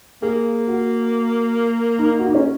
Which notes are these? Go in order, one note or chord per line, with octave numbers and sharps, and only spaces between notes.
A#3 G#4
F#4
D#4
F#4
D#4
C#4